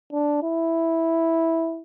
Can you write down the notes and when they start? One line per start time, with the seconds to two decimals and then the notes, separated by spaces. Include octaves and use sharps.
0.13 D4
0.43 E4